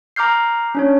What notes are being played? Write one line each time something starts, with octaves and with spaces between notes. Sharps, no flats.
A#5 D6 F6 G6 C7
C#4 D4 C#5